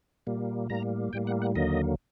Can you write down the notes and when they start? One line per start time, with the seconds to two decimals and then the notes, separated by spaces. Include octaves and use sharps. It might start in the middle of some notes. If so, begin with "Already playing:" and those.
0.27 A#2 G3 A#3
0.69 A2 G3 A#3 A#5
1.13 A2 G3 A#3 G5
1.27 F#5
1.42 F#5
1.55 D#2 D3 F#3 A#3 D#5